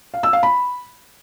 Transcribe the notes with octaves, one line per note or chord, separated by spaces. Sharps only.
F5
E6
F5
B5